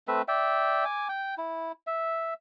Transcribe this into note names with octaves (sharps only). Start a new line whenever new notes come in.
A3 C4 B4 E5
D5 E5 G5
G#5 D6
G5
E4
E5